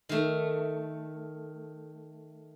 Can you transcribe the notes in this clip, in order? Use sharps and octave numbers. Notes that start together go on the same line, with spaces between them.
D#3 A3